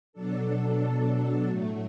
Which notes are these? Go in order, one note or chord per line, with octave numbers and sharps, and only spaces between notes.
B2 F#3 D4 A4
A2 F#3 A3